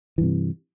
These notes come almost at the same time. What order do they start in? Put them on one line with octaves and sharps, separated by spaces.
E3 G2 C3